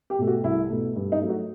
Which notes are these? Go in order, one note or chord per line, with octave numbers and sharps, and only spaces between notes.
G4
B2 A3
F#4
C2 E4
B2 A3
G2
D#4
F#3 A3
F#4